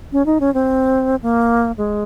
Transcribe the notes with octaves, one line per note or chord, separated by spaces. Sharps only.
C#4
D#4
C#4
C4
A#3
G#3